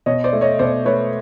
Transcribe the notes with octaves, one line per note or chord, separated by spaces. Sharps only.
B2 C#5 D#5
C5 D5
A3
C#5 D#5
B2 C5 D5
A3 B4 C#5